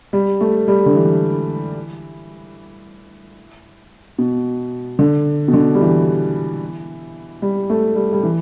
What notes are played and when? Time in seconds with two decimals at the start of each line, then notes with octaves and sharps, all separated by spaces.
0.13 G3
0.41 A3
0.68 G3
0.86 D3
0.95 E3
4.18 B2
4.99 D3
5.48 B2
5.54 D3
5.74 G3
5.81 E3
7.42 G3
7.70 A3
7.96 G3
8.13 G3
8.23 E3